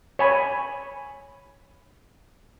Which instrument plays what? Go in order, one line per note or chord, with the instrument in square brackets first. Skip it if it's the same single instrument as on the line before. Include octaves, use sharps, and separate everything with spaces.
[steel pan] C#5 G#5 B5